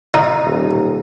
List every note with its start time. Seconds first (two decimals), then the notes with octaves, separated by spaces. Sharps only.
0.14 D#4
0.44 D#1